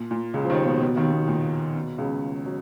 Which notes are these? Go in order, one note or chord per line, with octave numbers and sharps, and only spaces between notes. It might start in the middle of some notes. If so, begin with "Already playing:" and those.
Already playing: A#2
A#2
C#2 C#3
F3
D#2 D#3
B2
B2
D#2 D#3
B2
A#2
B2
C#2 C#3
F#3